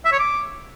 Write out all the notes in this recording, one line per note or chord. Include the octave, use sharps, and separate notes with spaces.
E5
C#5
D6